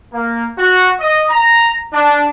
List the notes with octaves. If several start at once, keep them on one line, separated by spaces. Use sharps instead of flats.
A#3
F#4
D#5
A#5
D4